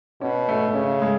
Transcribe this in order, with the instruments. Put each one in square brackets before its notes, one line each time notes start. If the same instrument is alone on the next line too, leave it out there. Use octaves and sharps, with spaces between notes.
[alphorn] B2 [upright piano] C#4
[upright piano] A3
[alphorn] C#3 [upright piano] C#4
[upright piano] G#3